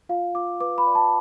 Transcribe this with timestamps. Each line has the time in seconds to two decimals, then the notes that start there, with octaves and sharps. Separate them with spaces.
0.09 F4 F5
0.35 F4 D6
0.60 B4 D6
0.78 B5
0.86 D5
0.95 A5